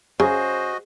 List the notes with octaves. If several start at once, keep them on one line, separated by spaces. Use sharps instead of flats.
C#3 F#4 G#4 C5 D#5